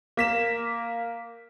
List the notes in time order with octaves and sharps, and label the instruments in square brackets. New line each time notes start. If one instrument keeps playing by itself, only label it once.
[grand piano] A#3 B6 E7